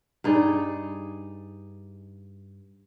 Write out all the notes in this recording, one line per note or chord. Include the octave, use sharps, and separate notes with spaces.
G2 D#4 G#4 D5